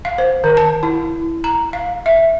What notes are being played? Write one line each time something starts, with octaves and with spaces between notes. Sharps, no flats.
F5
C5
D#3
A5
E4
A#5
F5
E5